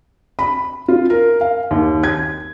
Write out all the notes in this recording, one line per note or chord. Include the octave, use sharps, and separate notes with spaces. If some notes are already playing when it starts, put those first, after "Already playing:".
B5
F4
A#4
F5
D#2
G#6